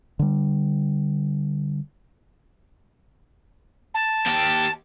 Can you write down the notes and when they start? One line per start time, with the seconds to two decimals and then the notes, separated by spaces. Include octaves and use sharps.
0.19 D3 G3
3.94 A5
4.26 D#2 G4